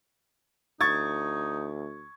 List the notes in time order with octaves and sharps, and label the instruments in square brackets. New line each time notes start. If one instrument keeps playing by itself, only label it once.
[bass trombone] D2 [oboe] D#4 [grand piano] C#6 G#6 A6